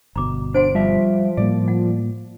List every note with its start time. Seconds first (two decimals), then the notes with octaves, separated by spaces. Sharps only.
0.16 G1 B2 A#5 D6
0.54 D4 C5 F#5 C6 D7
0.75 F3 G3 E5
1.37 A2 G3 A#3 D5
1.68 F#5